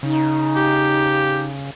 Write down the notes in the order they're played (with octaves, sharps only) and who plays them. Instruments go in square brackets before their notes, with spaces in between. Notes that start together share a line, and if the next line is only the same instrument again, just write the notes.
[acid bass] C#3 [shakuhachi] D#4
[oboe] G4